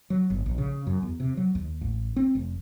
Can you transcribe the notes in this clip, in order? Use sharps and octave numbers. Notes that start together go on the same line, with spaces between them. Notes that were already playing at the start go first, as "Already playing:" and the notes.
F#3
G1
A#1
C#3
F#2
E2
C3
F#3
D#2
A1
C4
F1